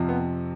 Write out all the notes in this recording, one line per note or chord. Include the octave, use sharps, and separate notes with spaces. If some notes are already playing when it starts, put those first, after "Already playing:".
Already playing: F2 C3 F3
B3